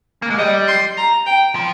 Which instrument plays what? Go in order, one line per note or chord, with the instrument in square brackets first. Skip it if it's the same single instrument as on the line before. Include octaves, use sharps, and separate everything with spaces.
[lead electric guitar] A#3
G#3
[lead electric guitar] G3 [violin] D#5
[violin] C6
A#5
G5
[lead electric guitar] F3